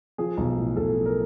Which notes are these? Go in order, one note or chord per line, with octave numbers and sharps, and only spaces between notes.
F3 G#4
B1
A2
B1 A4
F3
A#4